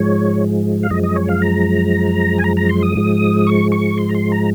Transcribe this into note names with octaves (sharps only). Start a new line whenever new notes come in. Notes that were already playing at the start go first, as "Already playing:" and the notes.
Already playing: G#2 F3 G#3 C#5
F5
F#2 F3 G#3 D#5
D#5
C#5
F5
A#5
G#5
A#5
A#5
C6
D#6
G#2 F3 G#3
C#6
C#6
C6
A#5
C6
A#5